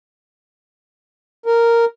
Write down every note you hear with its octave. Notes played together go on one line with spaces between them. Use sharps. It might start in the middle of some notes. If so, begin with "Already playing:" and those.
A#4